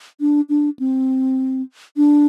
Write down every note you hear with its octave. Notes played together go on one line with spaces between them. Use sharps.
D4
D4
C4
D4